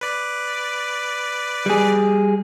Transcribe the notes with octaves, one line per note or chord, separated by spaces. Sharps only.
B4 D5
G3 G#4